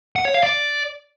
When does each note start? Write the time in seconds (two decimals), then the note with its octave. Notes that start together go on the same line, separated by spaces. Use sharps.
0.16 F#5
0.25 C#5
0.34 F5
0.44 D5